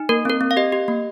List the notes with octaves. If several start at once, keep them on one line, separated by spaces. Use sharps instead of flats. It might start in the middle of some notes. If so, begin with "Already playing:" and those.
Already playing: D#4
A#3 A#4
C4 A#4
C4
F5
G4 D#5
G4
A#3